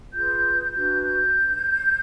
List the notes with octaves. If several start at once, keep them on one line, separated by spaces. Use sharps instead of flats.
F4 G#4 B4 G6
D4 F#4 B4 G6
G6